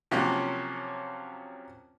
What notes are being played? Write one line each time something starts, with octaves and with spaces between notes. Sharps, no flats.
C3 F3 F#3 A#3 C#4